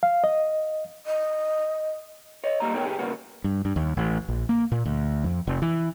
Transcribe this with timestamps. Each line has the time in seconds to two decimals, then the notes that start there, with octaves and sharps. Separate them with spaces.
0.03 F5
0.24 D#5
1.06 D#5
2.44 C#5 D#5
2.60 G3 A#3 D#5 A#5
2.74 B2 B3 D#4 A#4 C#5 G5
2.85 B2 G4 G#4
2.99 G2 C#3 A#3 B3 F#4
3.44 G2
3.65 G2
3.76 D#2
3.97 A1
4.29 A#1
4.49 A#3
4.72 A#2
4.85 D2
5.24 F2
5.47 F1
5.62 E3